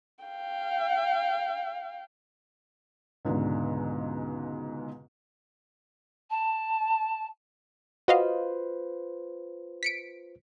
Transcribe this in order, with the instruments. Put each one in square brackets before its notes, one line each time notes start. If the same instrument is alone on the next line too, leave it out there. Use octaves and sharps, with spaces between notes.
[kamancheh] F5 G5
[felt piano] C#2 G#2 B2 D3
[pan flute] A5
[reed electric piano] F4 B4 C5 [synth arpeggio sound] F#4 D#5 F5
[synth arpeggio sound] B6 C#7 D7